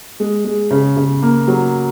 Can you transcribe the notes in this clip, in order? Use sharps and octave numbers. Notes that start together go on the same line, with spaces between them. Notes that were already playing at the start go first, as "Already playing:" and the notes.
G#3
G#3
C#3
C#3
A#3
F#3